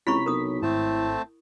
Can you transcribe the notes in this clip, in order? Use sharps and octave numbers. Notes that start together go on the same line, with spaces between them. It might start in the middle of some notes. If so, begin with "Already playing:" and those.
C#2 C3 E4 C#5 B5 C#6 B6
B1 A#4 D#6
G#1 A2 A3 C4 A5